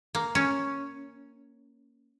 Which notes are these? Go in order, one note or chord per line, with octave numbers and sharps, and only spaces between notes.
A#3
C#4